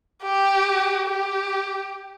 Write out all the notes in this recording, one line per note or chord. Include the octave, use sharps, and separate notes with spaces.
G4
G4